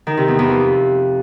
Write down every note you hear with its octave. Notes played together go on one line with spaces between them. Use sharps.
D#3
C3
E2
E2
F2